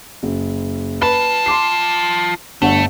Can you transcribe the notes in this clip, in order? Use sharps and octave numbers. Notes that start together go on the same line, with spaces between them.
F#1
F4 B4 A5 B5
C6 D6 C7
G1 D3 A3 F#5